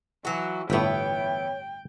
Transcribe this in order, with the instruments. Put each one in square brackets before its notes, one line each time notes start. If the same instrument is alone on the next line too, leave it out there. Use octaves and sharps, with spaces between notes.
[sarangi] E3 [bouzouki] F#3 F#4
[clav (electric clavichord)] G1 A2 [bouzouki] E3 B3 [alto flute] C#5 [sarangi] G5